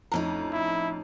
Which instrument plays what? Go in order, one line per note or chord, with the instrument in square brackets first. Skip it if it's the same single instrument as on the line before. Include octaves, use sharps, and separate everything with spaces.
[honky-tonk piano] F2 A#5 [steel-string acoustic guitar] A2 C#4 D#4
[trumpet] E4